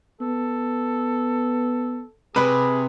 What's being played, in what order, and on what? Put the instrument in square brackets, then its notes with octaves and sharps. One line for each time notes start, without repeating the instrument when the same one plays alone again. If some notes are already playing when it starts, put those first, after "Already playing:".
[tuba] B3 [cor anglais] A4
[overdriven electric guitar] C3 [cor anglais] G#4 [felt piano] B4 B5